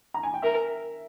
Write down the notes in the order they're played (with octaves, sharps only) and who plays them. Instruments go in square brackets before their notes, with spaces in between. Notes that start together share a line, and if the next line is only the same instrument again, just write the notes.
[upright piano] A#5
G#5
G5
[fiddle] A#4 [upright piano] E5